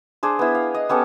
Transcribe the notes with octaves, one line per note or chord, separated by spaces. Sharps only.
D4 G#4 C5
B3 E4
F5
D#5
B3 C#4 G4 A4